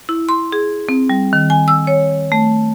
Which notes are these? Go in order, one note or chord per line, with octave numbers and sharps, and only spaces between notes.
E4
C6
G#4
C4
G3
D#3
G#5
E6
C#5
A3